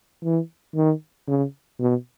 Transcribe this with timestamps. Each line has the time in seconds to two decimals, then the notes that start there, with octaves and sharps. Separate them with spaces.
0.24 E3
0.76 D#3
1.28 C#3
1.79 B2